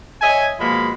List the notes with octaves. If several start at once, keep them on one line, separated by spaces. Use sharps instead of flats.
C#5 D#5 E5 G#5
B2 F3 G#3 A#3 B5